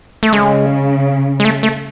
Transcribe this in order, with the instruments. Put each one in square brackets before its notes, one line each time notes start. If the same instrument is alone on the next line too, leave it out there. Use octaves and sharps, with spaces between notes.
[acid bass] A3
[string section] C#3 [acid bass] G#3
[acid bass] G#3
A3
A3